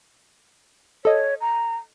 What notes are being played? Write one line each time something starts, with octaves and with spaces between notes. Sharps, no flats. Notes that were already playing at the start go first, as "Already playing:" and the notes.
A4 C#5 D#5
A#5